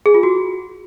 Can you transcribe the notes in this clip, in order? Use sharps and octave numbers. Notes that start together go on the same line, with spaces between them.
G#4
F4
F#4